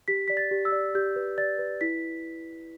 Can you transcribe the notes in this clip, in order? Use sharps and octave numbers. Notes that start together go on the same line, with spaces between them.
G4 B6
D5 B6
A6
G4
E6
D5
G4 G6
B4
D5 A6
B4
E4 B6